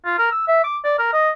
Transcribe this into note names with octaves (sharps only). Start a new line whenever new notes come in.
F4
A#4
E6
E5
D6
D5
A#4
D#5